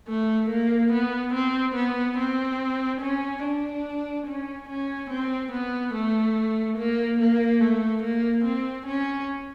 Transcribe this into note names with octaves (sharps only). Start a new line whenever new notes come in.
A3
A#3
B3
C4
B3
C4
C#4
D4
C#4
C#4
C4
B3
A3
A#3
A#3
A3
A#3
C4
C#4